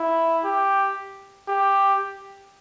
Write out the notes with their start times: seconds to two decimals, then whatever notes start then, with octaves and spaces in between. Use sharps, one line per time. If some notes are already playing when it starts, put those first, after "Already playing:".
Already playing: E4
0.45 G4
1.48 G4